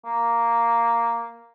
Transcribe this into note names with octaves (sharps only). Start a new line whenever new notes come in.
A#3